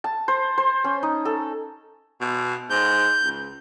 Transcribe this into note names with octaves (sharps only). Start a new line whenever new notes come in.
A5
C5
C5
C#4
D#4
A4
B2
G#2 G6
C#2